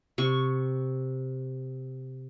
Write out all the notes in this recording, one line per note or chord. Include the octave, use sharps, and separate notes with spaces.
C3 C#6